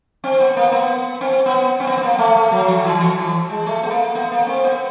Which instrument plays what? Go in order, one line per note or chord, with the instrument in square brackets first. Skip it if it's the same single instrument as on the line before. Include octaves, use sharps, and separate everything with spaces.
[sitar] C4
B3
A#3
B3
C4
B3
C4
B3
B3
A#3
A3
A3
F#3
F3
E3
F3
E3
G#3
A3
B3
A#3
B3
A#3
C4
B3